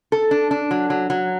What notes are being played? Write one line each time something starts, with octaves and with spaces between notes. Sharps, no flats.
A4
D4
D4
F#3
F#3
F#3